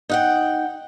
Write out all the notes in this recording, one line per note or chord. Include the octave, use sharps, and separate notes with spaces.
D#4 F#5 G5